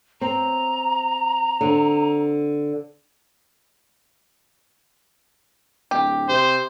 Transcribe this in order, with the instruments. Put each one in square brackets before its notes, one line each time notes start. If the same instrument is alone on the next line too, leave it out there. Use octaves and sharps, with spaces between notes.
[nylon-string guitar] C4 [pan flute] A#5
[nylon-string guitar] D3 C4
[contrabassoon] D1 [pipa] G4
[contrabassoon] C3 [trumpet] C5